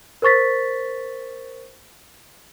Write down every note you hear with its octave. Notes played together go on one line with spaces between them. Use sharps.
A#4 C5 C#6 A6 B6